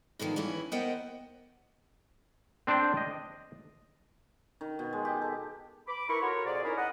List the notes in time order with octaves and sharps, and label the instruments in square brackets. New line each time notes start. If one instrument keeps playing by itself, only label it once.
[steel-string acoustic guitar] B2 D3 D#3 F3 B3
E3 B3 C#4 E4
B3 A#4 C5 D#5 F#5 G5
[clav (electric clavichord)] C4 D4 C5 D5 G5
D#5
[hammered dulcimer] D#3
B2
G#3
G4
A4
[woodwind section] B5 D6
E4 A#4 B4 C#6
F#4 A4 A#4 C#5 A#5 C6
F2 A#2 G#4 D5
C#4 D#4 E4 A#4
D#5 F#5